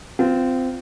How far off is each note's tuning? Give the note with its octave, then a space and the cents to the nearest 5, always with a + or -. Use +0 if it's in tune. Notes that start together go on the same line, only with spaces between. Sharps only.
C4 -20 F4 +0